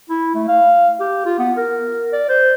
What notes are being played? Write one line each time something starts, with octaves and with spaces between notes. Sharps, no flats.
E4
A3
F5
G4
F4
B3
A#4
D5
C5